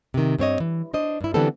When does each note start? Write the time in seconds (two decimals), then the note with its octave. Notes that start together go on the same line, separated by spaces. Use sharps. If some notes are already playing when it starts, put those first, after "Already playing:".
0.14 C3 D#3
0.39 G2 C4 C#5 D#5
0.60 E3
0.94 D4 C5 D#5
1.21 G2 E4
1.34 D3 E3 G3 B3 C4 A4